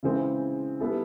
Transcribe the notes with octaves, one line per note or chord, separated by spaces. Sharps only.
C#3 E3 G#3 C4
G3 B3 E4 A4